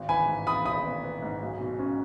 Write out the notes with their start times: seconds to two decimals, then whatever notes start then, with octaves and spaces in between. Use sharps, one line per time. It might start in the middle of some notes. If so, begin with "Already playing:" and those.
Already playing: G#1
0.09 E3 G#5 B5
0.28 G#2
0.47 E3 B5 D#6
0.65 G#1 B5 D#6
0.85 B3
1.04 B3
1.22 G#2
1.42 B1
1.60 B2
1.79 C#4